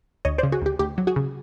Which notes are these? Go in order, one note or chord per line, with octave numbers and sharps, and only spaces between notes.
D2 C#5 D#5
C#3 C5 D5
F#4 G#4
D2 G4
D2 G4
F#3
F#4 G#4
C#3